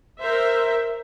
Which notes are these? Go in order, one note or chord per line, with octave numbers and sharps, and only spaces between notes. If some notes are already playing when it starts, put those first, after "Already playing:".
A#4 C5 E5